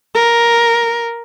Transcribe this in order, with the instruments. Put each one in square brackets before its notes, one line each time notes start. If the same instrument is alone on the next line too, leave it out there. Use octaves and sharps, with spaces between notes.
[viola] A#4